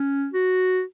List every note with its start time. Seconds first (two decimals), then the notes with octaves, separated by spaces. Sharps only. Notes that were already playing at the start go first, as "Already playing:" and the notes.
Already playing: C#4
0.34 F#4